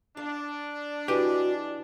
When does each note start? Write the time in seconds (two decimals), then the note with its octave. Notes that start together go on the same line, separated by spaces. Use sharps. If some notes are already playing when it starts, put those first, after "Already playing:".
0.17 D4 F5
1.08 E3 F#4 G4 D#5 G#5